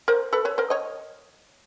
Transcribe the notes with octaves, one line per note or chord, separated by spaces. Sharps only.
A#4 C5
A4 B4
B4 C#5
A#4 C5
C#5 D#5